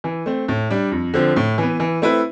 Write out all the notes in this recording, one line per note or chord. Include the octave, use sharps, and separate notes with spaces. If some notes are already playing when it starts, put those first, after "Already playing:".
E3
A3 C4
A2
G3 D4
F2
D3 F3 C4
A2
E3 B3
E3
A3 C4 E4 B4